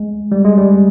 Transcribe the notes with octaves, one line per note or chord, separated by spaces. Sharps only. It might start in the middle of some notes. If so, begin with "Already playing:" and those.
Already playing: G#3
G3
G#3
G3